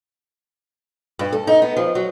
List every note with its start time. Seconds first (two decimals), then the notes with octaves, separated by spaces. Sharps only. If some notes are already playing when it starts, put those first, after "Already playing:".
1.19 G2
1.32 A4
1.47 D#4
1.62 B3
1.77 F3
1.95 F#3